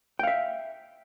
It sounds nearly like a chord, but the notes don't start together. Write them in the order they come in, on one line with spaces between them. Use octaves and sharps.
G5 F5 E5